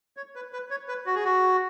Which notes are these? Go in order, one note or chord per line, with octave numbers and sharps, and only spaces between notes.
C#5
B4
B4
C#5
B4
F#4
G#4
F#4